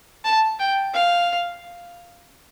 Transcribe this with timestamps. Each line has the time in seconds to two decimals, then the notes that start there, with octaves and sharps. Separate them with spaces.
0.25 A5
0.59 G5
0.93 F5